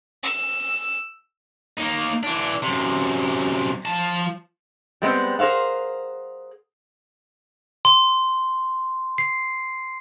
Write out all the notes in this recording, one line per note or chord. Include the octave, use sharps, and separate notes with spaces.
E6
A#3 D#4
E3 D4
F#2 C3
F3 A5
G3 G#3 B3 C4
G#4 A#4 C5 F5 F#5
C6
C7